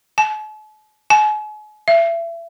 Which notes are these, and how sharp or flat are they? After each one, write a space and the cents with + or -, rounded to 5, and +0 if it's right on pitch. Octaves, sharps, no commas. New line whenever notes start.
A5 -45
G#5 +40
E5 +30